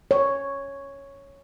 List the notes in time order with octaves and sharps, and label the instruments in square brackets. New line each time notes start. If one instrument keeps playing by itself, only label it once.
[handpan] C#5